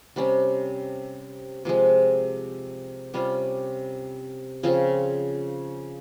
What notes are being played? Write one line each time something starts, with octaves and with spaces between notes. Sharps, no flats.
C3 G3 C#4
C3 F3 G#3
C3 G3 C#4 F4
C#3 F3 C4 F4